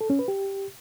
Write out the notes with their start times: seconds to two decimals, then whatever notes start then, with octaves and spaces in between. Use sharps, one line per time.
0.01 A4
0.10 C#4
0.19 B4
0.28 G4